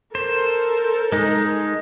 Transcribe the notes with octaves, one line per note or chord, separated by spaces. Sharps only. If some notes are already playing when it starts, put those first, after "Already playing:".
A4 A#4 C5
G#3 D#4